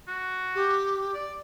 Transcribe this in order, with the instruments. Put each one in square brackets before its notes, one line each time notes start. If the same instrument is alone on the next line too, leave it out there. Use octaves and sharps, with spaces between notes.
[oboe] F#4
[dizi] G4
[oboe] D5